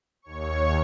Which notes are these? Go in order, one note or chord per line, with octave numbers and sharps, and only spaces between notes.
D#2 C#5 C#6